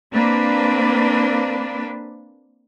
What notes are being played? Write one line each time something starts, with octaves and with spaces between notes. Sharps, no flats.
A#3 C4 D4 B4